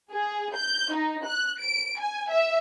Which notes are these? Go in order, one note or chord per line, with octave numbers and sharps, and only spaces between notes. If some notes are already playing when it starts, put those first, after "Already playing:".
G#4
G6
D#4
F#6
D7
G#5
E5